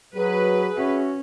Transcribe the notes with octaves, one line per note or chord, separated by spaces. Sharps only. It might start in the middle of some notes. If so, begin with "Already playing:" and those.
F#3 G#4 B4
C#4 F#4 E5